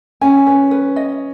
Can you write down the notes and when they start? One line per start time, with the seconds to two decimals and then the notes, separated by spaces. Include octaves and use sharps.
0.21 C#4 G#5
0.46 C#4 B4
0.71 B4
0.96 D#5